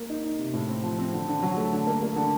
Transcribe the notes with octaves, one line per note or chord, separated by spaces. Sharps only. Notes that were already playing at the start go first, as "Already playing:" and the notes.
Already playing: A#3
D#4
D#4
C3
A2
C4
F3
C4
D3
D3
F#3
A3
D3
A#3
A#3
D3